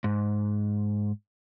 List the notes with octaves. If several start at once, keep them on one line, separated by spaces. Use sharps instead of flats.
G#2